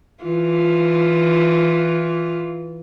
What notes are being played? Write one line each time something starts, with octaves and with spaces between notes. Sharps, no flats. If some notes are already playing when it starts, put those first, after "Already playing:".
E3 F4